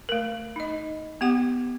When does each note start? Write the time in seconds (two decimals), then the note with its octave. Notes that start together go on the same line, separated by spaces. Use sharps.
0.09 A3 A#4
0.56 D#4 D#5
1.21 B3 G4 F#5 D6